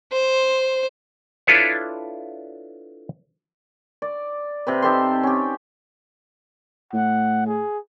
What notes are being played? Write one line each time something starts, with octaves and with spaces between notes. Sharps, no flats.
C5
D4 E4 F4 A4 B4 C#5
D5
C3 C4 B4
D#4 G4 A4 C6
C#4 G4
A2 F#5
G#4